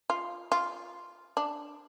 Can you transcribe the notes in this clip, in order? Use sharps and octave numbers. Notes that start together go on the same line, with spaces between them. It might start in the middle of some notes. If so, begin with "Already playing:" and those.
F4
F4
D4